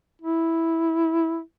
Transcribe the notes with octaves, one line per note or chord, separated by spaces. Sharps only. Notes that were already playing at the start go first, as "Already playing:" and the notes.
E4